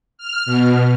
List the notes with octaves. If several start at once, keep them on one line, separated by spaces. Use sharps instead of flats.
F6
B2